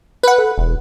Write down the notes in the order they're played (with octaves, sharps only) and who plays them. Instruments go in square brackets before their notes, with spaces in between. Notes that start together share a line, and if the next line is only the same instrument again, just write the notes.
[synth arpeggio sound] B4 F#5
[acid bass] A4
E1